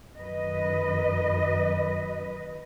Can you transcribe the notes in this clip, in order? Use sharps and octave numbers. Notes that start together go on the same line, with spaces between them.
F#2 D#3 B4 D#5